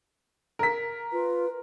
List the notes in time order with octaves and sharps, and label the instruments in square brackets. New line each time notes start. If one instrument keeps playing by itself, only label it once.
[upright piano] A#4 B6
[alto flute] F4 [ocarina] B4